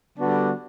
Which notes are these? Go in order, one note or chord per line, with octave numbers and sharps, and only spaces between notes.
D3 G3 B3 D4 F#4